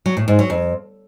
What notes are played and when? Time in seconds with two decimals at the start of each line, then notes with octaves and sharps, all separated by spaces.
0.06 F#3
0.17 A2
0.28 G#2
0.39 F#3
0.50 F2